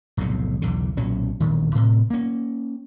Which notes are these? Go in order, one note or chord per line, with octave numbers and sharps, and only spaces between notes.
F1 B1 E2 A2
B1 E2 C#3
B1 A#2 F#3 C#4
E1 A#1 D#3
A2 C3
A#3 C#4